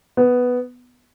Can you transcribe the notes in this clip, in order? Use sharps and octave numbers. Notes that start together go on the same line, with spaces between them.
B3